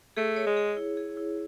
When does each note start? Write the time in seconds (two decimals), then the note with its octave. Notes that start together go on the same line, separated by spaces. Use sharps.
0.17 A3 G#4
0.36 C#5
0.47 G#3
0.57 G#4
0.77 E4
0.97 G#4
1.17 E4